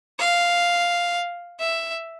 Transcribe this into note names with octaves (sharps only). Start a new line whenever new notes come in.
F5
E5